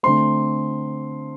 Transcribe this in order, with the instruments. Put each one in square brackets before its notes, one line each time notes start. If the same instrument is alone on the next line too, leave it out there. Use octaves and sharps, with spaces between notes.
[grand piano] D3 A3 C4 C6